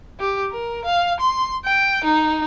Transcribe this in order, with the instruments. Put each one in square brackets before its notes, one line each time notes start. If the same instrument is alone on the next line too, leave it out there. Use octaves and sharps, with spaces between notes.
[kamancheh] G4
A#4
F5
C6
G5
D#4